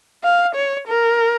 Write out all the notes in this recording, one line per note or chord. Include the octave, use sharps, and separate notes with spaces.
F5
C#5
A#4